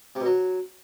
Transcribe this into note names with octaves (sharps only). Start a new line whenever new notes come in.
C3
B2
F#3